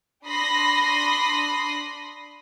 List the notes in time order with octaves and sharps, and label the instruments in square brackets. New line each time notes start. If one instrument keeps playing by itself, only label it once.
[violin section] D4 B5 C6 D#6 A#6 C7